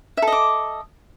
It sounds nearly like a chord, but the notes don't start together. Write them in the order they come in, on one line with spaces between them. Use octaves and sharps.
E5 A4 D#5 D6